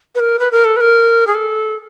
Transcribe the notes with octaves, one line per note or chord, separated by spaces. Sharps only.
B4
A#4
B4
A#4
A4
B4
A#4
G#4
A4